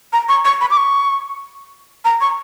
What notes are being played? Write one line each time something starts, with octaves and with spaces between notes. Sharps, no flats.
A#5
C#6
C#6
B5
D6
C#6
A#5
C#6